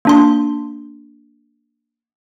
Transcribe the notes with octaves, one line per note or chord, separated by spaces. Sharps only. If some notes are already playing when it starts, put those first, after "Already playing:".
A#3 D4 C6